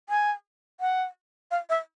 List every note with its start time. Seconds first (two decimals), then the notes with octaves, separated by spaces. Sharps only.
0.09 G#5
0.80 F#5
1.51 F5
1.70 E5